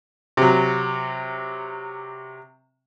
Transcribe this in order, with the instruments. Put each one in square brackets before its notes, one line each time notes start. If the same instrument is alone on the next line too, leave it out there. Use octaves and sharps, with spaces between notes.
[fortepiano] C3 F#3